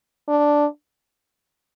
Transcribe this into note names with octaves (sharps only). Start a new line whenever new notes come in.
D4